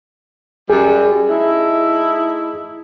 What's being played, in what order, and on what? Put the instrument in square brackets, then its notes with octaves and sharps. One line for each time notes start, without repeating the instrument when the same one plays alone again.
[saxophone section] F#2 G3 [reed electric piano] G#4
[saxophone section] A3 D#4 E4